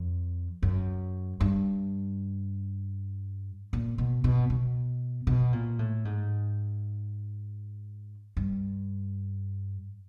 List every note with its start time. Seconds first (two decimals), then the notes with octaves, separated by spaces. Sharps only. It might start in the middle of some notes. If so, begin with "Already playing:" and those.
Already playing: F2
0.62 F#2
1.40 G2
3.73 A#2
3.98 B2
4.24 B2
4.50 B2
5.27 B2
5.53 A#2
5.79 A2
6.05 G#2
8.37 G2